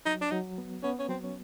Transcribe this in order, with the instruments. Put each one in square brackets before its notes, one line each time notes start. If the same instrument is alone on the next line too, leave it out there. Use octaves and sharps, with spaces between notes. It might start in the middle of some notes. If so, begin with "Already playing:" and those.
[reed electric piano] F#3 [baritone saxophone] D#4
[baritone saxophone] D4
[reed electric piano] F#3 [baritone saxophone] D#4
[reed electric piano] B3
[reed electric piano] B3 [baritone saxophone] C#4
[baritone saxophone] C#4
[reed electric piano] F#3 [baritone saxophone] C4
[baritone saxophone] C#4